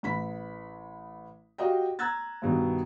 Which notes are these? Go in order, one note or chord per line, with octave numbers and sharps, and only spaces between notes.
A1 B5 B6
F#4 G4 D#5 F5 G5
A#5 E6 F#6 G#6 A6
G2 B2 D#3